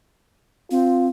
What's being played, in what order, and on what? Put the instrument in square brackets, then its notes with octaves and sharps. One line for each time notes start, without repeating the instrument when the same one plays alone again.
[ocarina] C4 [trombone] F4